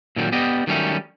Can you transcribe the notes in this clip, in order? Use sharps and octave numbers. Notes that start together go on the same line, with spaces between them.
A#2 D#3 F#3 G3
B3 G4 D5 D#5
D#3 F#3 G3 A3 C#4